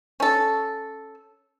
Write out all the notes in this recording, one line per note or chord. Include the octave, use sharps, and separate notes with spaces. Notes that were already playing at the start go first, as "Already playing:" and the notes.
C#4 A4